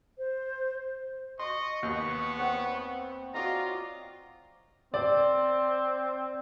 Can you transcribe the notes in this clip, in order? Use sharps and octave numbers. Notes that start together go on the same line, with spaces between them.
C5
D#5 C6 C#6
D#2 B3
C4 C#5 F#5
F4 F#4 D5 D#5 A#5
C4 D5